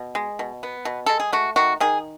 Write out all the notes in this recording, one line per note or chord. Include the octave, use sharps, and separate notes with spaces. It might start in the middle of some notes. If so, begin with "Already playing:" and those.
Already playing: B2
G#3
B2
B3
B2
G#3 A4
G#4
A3 F#4
D#3 F#4
D#3 G#4